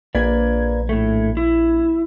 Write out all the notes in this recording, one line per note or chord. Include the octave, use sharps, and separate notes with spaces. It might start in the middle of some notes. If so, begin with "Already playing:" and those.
A#1 A#3 B4 D5 G#6
A2 A3
E4